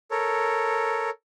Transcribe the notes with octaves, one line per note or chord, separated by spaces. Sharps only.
A4 A#4 C#5